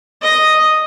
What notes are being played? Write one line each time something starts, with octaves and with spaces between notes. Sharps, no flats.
D#5